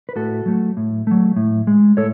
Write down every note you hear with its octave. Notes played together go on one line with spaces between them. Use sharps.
B4
A2 F#4 A4
F#3 A3
A2
F#3 A3
A2
G#3
A2 A4 C#5